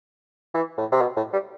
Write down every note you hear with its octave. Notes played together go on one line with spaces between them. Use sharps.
E3
A2
C3
B2
A2
G3